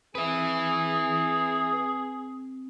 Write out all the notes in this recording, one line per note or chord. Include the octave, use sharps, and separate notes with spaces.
C4 G#4 B4 E5